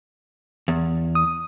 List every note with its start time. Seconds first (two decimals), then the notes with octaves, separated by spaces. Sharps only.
0.68 E2
1.15 D#6